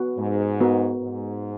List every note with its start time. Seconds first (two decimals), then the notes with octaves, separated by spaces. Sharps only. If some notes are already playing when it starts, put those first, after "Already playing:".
Already playing: B3 F#4 B4
0.18 G#2
0.61 B3 F#4 A#4
1.03 G#2